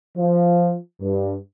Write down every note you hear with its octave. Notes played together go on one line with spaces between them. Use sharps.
F3
G2